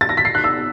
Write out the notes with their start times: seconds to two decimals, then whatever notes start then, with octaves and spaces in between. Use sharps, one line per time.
0.01 A6
0.09 A#6
0.17 B6
0.25 C7
0.35 F#6
0.44 E6